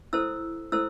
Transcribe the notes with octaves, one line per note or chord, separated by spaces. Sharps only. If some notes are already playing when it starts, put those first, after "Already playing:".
E4 A4 C5 E6
E4 A4 C5 E6